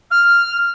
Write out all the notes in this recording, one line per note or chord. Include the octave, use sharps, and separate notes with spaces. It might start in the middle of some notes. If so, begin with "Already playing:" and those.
F6